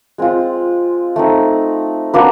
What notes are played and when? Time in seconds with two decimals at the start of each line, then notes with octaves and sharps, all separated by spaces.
0.18 G#3 C4 F4
1.16 A3 C4 D#4
2.14 A#3 D4 F#4 B4